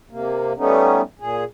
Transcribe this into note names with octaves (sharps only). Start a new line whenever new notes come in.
C3 A#3
G3 A3 B3 C#4 D#4
A#2 G#4